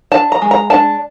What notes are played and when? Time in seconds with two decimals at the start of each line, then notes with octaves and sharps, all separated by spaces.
0.12 D4 A5
0.32 A#5
0.42 G#3
0.51 A#5
0.70 D4 A5